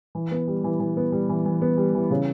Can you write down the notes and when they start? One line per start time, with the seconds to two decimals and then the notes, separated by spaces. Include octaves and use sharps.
0.15 E3
0.31 B3
0.48 G3
0.64 E3
0.80 E3
0.97 B3
1.12 G3
1.29 E3
1.45 E3
1.62 B3
1.78 G3
1.95 E3
2.10 C#3